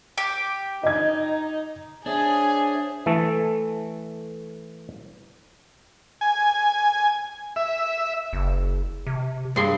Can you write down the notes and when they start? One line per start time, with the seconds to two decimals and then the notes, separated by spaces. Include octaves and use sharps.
0.18 G4
0.84 D#4 D#5 G#6
2.06 D4 G#4 C5 C#5 E5 G#5
3.06 E3 A3 A4
6.21 G#5
7.56 E5
8.33 F#1
9.07 C3
9.56 G2 G#4 C6